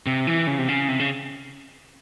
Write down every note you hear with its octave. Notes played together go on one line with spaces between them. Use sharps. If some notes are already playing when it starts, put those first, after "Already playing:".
C3
E3
C#3
C3
C#3
C3
C#3